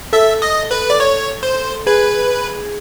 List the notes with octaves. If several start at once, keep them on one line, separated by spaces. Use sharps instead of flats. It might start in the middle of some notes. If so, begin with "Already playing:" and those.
A4 E5
D#5
B4
D5
C#5
C5
G#4 B4